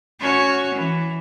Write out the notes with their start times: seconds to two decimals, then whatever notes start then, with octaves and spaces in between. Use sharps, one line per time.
0.20 C#4 F#4 C#5
0.75 E3